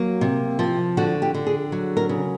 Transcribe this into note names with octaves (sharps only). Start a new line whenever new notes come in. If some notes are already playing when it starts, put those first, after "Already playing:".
Already playing: F#3 A#3
C3
F3
D3 F#4
G4
D3
G#4
F#3
A#4
C#3